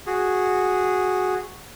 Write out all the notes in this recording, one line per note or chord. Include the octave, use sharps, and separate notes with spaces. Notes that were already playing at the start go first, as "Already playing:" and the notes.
F#4 G#4